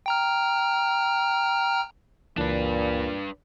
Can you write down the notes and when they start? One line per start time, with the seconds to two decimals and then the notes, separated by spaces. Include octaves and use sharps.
0.06 G5 A#5 F6
2.38 C#2 A#2 E3 D4 B4 A5